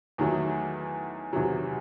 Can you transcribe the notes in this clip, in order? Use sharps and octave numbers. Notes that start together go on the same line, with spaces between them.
E2 D#3 F#3 A3
E2 C3 D#3 F#3